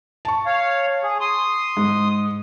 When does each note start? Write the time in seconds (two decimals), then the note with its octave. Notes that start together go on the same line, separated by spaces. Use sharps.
0.25 A5 C#6
0.46 C#5 F5
1.03 G#4
1.21 C6 D#6
1.77 G#2